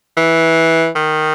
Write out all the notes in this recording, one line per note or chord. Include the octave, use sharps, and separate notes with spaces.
E3
D#3